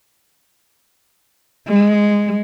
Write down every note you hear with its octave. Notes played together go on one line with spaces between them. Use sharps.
G#3